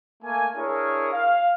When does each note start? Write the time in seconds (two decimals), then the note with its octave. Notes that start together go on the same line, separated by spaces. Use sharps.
0.23 A3 A#3 G#5
0.56 D4 E4 G#4 A#4 C#5
1.12 F5